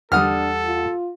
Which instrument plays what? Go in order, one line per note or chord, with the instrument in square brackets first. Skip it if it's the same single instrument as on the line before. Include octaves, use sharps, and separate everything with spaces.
[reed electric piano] E2 F#5 [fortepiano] G3 D#6 F6 [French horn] D4 [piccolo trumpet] A4
[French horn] F4